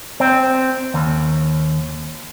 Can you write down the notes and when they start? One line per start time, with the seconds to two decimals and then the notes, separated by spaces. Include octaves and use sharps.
0.20 C4
0.94 D#2